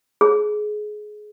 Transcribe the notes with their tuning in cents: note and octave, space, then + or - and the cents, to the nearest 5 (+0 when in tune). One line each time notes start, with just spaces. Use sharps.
G#4 +20